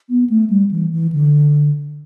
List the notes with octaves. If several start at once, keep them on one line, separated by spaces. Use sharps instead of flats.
B3
A3
G3
E3
E3
D3